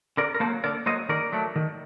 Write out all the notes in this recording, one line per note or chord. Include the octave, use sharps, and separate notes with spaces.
D3 A#4 D5
A#4
A#3 A4 C5
F#3
D3 A#4 D5
F#3 A#3 C5 D#5
D#3 A#4 D5
F#3 A3
D#3